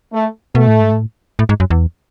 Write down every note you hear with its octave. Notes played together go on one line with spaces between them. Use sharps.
A3
B2 A3
A2
G#2
A2
A2
G#2
F#2
E2